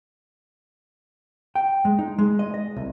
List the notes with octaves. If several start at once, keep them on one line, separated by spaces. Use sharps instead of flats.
G5
G#3
D#4
G#3
D#5
D#5
C2